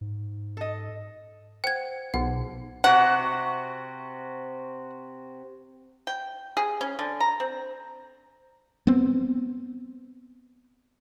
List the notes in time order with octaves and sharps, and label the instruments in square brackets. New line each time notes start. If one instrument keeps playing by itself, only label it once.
[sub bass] G#2
[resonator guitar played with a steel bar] A4 D#5
[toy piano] C5 F#5 [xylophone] G5 G#6
[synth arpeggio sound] B1 [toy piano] D#4 F#4 G#4 [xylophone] F#5
[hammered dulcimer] C3 F#4 [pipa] F#5
[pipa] G5
G#4
C#4
D3
A#5
C4
[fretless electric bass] B3 C4